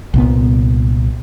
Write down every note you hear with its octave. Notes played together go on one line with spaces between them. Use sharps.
C2 A#2 B3